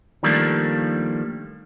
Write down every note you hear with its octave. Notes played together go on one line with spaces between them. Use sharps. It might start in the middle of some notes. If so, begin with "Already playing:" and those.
D#3 F3 G3 A3 A#3 D4